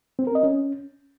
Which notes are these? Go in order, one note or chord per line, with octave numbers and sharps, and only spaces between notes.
C4
A#4
D#5
C#4